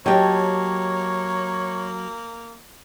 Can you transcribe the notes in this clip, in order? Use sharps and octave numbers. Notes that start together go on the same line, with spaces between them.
F#3 A#3 G4 C#5 D#5 G5 A5